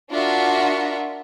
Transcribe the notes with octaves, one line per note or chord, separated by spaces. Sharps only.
D4 F4 F#4 A#4 E5